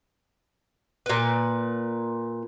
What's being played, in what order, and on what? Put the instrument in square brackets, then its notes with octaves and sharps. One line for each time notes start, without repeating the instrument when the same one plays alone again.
[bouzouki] A#2 B4